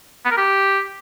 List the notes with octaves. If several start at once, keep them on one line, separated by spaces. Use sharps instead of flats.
B3
A#4
G4